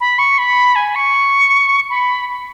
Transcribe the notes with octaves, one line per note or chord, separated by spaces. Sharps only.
B5
C#6
B5
G#5
C#6
B5